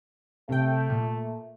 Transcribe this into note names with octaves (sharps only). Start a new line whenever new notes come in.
C3 A3 G5
A#2